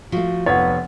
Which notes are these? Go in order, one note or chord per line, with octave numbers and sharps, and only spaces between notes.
F3 A3 F#4
F1 B3 C#5 F#5 A6